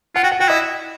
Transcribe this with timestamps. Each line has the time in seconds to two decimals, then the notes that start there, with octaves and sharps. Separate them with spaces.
0.15 F4 F#5
0.23 F#4 G5
0.32 F#5
0.40 F#4 G5
0.48 E4 D#5